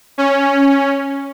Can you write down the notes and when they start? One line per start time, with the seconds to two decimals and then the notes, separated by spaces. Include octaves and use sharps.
0.18 C#4